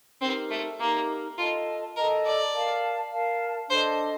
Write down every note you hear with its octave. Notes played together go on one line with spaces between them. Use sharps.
C4 D#4 G4 A#4
A3
A#3 D#4 G4 A#4
F4 A4 D#5 A5
A4 A#4 D#5 A5
D5
A#4 F5 A5
A#4 F5 A5
D4 A4 C5 D#5